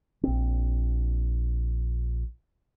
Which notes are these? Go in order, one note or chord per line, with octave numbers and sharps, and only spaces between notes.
A#1 C4